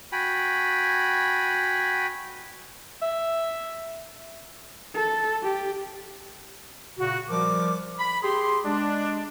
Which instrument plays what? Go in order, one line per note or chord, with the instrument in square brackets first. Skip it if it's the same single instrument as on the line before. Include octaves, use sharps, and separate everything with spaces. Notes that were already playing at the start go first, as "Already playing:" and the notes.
[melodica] F#4 G5 G#5 B5
[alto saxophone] E5
[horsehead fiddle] A4
G4
[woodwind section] A#2 C#3 F#4
F3 G3 A#4 D6
B5
G4 G#4 C6
G#3 D4